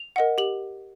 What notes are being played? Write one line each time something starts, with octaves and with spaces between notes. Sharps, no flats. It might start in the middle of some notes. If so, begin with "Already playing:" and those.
Already playing: F7
A#4 D#5 F#5
G4 F#7